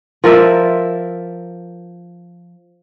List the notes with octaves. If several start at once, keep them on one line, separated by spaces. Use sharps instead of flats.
F3 A#4 D5 E5